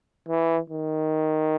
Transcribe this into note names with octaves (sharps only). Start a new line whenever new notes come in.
E3
D#3